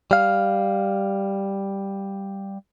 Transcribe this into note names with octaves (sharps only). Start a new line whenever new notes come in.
G3 F5